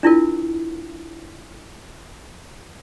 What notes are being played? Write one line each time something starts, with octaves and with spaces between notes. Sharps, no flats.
D4 E4 F4 A#4